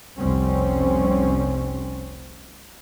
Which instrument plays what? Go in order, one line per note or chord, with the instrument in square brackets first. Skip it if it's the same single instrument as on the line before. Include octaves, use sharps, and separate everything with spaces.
[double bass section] F1 C2 G3 C4 C#4